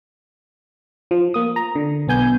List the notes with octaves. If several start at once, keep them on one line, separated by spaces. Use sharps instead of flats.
F3
A#3 D#6
A#5
D3
B1 B3 G#5 G6